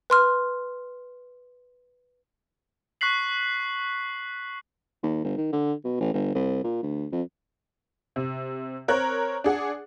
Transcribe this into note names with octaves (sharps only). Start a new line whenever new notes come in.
B4 C6 F6
C#6 F#6 B6 C7 F#7
D#2
G1
D#3
D3
B2
A1
G1
C2
A#2
D2
F2
C3
C4 A#4 C#5 F#6
D4 G#4 F#5